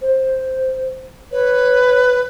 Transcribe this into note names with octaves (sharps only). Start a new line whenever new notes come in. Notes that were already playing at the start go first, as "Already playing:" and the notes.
C5
B4 C#5